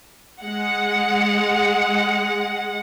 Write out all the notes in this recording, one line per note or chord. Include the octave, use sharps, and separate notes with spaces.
G#3 F#5